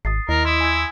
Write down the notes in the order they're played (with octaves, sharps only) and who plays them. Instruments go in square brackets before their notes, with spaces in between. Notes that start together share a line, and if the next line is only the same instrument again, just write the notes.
[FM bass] G#1 [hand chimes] D#6 A6 C7
[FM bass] D#2 [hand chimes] E4 D#5 [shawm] A#4
[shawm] E4 [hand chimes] C6 D#6
[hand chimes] G#5 E6 G#6